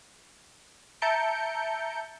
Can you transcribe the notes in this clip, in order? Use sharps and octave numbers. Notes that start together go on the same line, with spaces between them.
E5 A5 A#5 G6 C#7 D7